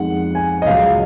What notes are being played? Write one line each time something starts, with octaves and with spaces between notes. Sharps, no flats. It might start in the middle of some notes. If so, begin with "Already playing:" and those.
Already playing: F2 D#3 G#3 F#5
G#5
D#5
C#2 C#3 F#3 F5